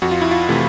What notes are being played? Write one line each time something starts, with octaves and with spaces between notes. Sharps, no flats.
F2 F#4
F4
E4
F4
C3 E3 A3